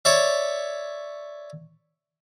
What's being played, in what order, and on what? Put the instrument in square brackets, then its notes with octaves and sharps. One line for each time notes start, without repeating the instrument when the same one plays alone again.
[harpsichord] C#5 D5 E5